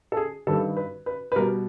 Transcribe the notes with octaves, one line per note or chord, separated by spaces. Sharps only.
A4
G#4
G2 D#3 G3 A4
B4
B4
B4
B2 G3 A#4